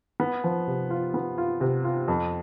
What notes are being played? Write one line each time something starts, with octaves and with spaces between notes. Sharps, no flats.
B3
F3
C3
F4
B3
F4
C3
F4
F2